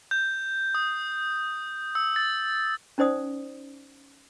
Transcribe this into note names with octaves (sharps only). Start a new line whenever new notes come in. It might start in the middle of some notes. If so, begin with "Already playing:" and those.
G6
D#6
E6
A6
C#4 D#4 C5 D5 D#6